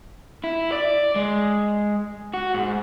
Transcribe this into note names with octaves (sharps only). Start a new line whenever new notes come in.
E4
D5
G#3
F#4
G#2